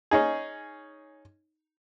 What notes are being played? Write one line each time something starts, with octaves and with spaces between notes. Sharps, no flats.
C#4 D#4 G#4